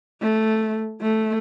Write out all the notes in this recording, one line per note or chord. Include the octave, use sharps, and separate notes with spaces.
A3
A3